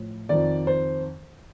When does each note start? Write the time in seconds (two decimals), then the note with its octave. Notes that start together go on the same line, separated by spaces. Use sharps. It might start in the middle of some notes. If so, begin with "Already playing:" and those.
Already playing: A2 F3
0.29 F2 D#3 D5
0.67 C5